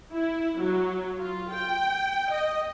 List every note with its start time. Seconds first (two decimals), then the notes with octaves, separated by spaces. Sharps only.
0.11 E4
0.59 F#3
1.19 F4
1.53 G5
2.32 D#5